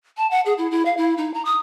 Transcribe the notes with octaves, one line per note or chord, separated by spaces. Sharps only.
A5
F#5
G#4
E4
E4
F5
E4
D#4
A#5
D#6